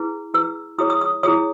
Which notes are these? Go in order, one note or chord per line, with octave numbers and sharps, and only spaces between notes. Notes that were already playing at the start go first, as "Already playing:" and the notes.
Already playing: E4 G#4 B4
E4 G#4 B4 E6
E4 G#4 C#5 D#6
D#6
D#6
E4 G#4 C#5 D#6